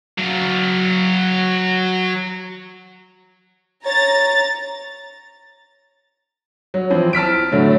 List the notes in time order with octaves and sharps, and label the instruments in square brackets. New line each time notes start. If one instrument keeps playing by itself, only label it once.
[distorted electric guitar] F#3 F5
[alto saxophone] C#5 [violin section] A#5 A6
[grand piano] F#3
E3 F3 C4
A5 F6 B6 D7
A2 D3 F#3 A3